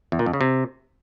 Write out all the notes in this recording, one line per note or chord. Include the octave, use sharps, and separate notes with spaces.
E2
A#2
F2
C#3
C3